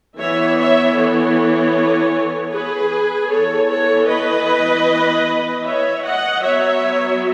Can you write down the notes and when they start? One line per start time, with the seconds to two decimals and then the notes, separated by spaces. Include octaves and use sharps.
0.18 E3 B3 C#5 E5
0.57 C#5 E5
0.96 A4 C#5
2.52 G#4 B4
3.30 E3 B3 A4 C#5
3.69 A4 C#5
4.09 B4 D#5
5.65 C#5 E5
6.04 D#5 F#5
6.43 F#3 B3 C#5 E5